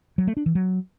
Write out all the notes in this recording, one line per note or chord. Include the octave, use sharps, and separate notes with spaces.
F#3
A3
D4
E3
F#3